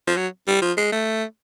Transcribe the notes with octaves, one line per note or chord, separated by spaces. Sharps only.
F3
F#3
G3
F3
G#3
A3